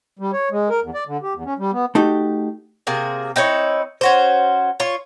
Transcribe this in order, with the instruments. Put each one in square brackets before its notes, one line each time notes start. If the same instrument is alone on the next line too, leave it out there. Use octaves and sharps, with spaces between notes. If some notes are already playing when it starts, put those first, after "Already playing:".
[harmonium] G3
C#5
G#3
A#4
E2
D5
D3
G4
E2
C#4
G3
B3
[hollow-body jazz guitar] A3 D#4 F#4 G4
[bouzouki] C3 A#3 G#4
C4 D#4 E4 C#5
C#4 F#4 C5
F4 C#5